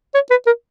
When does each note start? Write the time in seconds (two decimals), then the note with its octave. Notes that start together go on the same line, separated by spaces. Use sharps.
0.14 C#5
0.30 B4
0.47 A#4